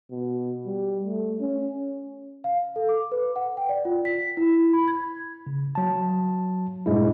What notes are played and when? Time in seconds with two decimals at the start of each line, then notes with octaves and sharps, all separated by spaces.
0.11 B2
0.66 G3
1.05 A3
1.41 C#4
2.44 F5
2.76 A4
2.89 D6
3.12 B4
3.36 F#5
3.57 G5
3.69 D5
3.85 F4
4.05 B6
4.37 E4
4.73 B5
4.88 G#6
5.47 C#3
5.75 F#3 A5
6.86 G2 A#2 G#3 E4